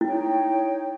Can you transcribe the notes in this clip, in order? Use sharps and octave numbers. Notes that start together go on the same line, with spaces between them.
D#4 E4 C#5 G5